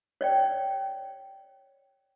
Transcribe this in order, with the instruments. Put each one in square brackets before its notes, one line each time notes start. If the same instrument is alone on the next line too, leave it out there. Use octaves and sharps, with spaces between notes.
[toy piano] C#5 D5 G5